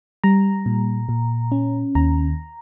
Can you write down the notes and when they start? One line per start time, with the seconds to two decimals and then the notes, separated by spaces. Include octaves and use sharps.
0.24 G3 A#5
0.66 A#2
1.09 A#2
1.52 C#4
1.95 D#2 A#5